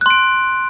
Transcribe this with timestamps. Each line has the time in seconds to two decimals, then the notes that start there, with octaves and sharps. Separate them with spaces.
0.01 F#6
0.06 C6
0.10 D7